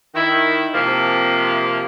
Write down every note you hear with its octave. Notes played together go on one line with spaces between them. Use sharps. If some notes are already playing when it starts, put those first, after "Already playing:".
D#3 E4
C3 F3 A#3